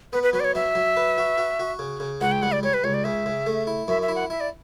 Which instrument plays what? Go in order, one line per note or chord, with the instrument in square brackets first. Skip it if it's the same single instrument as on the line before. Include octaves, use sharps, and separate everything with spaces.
[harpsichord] B3 [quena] B4
[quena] B4
[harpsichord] F#3 [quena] B4
[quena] D5
C#5
[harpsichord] F#3 [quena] E5
[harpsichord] F#3
B4
F#4
F#4
F#4
C#3
C#3
[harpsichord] C#2 [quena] F#5
[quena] G5
[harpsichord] G3 [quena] F#5
[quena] D5
[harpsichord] G3 [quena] C#5
[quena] B4
[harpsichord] C#2 [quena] C#5
[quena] D5
[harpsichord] C#3 [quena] E5
[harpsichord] C#3
A3
E4
[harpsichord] F#2 [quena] E5
[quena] E5
[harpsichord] E4
[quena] F#5
[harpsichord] E4 [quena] E5
[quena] D5